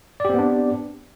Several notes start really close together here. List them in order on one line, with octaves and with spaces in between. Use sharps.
D5 G4 C4 B3 D4